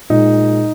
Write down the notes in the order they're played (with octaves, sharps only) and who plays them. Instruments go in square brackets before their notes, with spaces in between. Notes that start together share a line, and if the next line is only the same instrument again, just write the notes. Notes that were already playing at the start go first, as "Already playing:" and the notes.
[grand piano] A#2 G#3 D#4